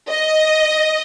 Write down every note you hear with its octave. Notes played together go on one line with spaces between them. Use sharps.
D#5